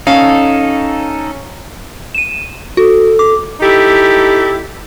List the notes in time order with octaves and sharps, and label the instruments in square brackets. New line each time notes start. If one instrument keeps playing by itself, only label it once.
[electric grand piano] C#4 [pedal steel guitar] D#4 A4 [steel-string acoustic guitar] F5
[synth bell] D#7 E7
[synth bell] F#4 [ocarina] A4
[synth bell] D6
[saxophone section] D#4 E4 G4 A4